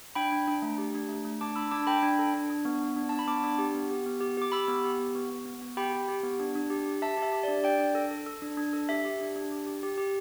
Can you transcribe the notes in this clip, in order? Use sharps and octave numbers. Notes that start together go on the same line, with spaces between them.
D4 G5 B5
D4
D4
A3
G4
D4
A3
A3
D4 A5 D6
D4 B5 E6
D4 A5 D6
A4 G5 B5
D4
A4
D4
D4
B3
B3
D4
D4 A5
B5
B3 A5 D6
D4
G4
B3
G4
B3
G4
G4 D6
G4 B5 E6
B3
G4
B3
B3
B3
B3
B3
G4 G5 B5
G4
G4
B3
D4
D4
G4
G4
G4 E5 A5
G4
E5
G4
D5
D4
D4 D5 G5
D4
A4
A4
A4
D4
D4
A4
G4 E5
G4
D4
D4
G4
G4
G4
G4